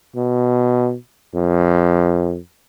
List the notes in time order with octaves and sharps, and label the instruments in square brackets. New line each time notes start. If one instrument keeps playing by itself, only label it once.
[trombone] B2
F2